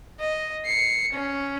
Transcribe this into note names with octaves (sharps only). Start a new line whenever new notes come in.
D#5
C7 C#7
C#4